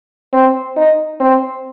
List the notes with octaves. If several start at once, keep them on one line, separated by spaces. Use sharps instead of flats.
C4
D#4
C4